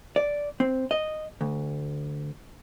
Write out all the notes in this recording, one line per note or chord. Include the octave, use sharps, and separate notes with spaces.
D5
C4
D#5
D2